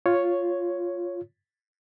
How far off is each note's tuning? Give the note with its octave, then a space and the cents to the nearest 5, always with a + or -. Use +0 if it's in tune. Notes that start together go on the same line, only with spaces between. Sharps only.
F4 +0 C#5 +0